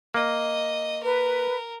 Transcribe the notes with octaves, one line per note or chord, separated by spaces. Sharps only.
A#3 D#5
A#4 B4